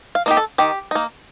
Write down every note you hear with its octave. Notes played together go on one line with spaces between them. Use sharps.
F5
A#3 D#4 G4
A4
D#3 G4
A#3 D#4